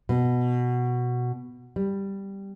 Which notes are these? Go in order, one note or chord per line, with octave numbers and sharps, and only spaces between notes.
B2
G3